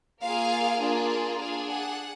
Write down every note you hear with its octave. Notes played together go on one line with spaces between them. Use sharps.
A#3 F4 G#4 F5
A#3 D4 F4 G#4
D4 G#4 F5
F#5